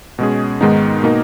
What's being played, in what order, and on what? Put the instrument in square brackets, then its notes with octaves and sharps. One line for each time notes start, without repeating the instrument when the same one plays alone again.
[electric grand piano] B2 G#3 C#4 G#4
G#2 D#3 G#3 B3 D#4
B2 A#3 D#4 A#4